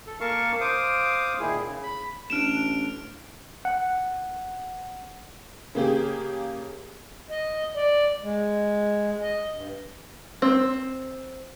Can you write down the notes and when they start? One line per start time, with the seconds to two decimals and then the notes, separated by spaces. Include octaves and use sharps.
0.07 A4
0.21 A#3 A#4 F5 A5 C#6
0.61 C5 F5 D6 D#6
1.39 A#2 D#3 E4 G#4
1.65 C#3
1.83 B5
2.30 A1 D4 F6 D7 E7 F7
3.65 F#5
5.75 C#3 A#3 G4 G#4
7.30 D#5
7.76 D5
8.21 G#3
9.21 D#5
9.51 G2
10.42 C4